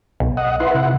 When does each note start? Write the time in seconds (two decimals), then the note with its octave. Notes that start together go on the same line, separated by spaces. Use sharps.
0.20 B1
0.37 D#5 F#5
0.60 E4 B4 F#5 C6
0.75 C3